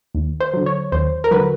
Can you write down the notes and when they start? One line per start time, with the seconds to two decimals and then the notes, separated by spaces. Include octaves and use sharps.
0.14 D#2
0.40 C5
0.54 D3 F#3
0.66 C#5
0.92 D#2 C5
1.24 A#4
1.31 D3 F#3 B4